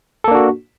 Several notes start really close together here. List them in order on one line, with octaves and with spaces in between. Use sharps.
A4 A#3 D4 F#4